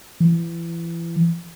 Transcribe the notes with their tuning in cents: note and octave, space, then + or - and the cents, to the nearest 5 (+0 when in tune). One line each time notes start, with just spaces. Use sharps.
E3 +30